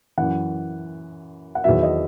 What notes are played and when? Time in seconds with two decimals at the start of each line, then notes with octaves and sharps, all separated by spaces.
0.18 F#2 E3 F#5
1.55 F#5
1.64 E2 D#3 F#3 E5
1.83 D#5